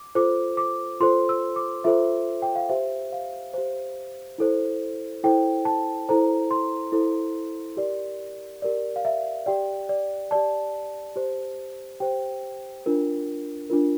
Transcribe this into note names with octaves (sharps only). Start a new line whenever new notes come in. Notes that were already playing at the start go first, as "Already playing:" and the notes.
Already playing: D6
F4 A4 C5 D6
D6
F4 A4 C5 C6
E6
D6
F4 A4 C5 E5
G5
F5
G4 C5 E5
F5
G4 C5
E4 A4 C5
E4 A4 C5 G5
A5
E4 A4 C5 A#5
C6
E4 A4 C5
G4 A#4 D5
G4 A#4 D5
F5
E5
G4 D5 G5
D5
G4 D5 A5
G4 C5
G4 C5 G5
D4 F4 A#4
D4 F4 A#4